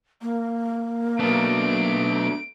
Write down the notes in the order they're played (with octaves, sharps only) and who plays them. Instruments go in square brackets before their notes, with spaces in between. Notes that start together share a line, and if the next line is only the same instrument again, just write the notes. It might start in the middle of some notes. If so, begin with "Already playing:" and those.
[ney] A#3
[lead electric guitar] F#3 B3 [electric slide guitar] A3 D4 [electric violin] D7